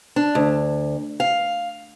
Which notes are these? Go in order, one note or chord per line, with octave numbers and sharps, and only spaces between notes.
D4
D2
F5